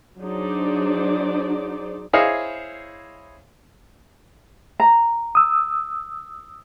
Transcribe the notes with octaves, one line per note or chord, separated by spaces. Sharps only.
F#3 D4 D#4 G#4 C5 D5
E4 G#4 C5 C#5 D#5 F5
A#5
D#6 E6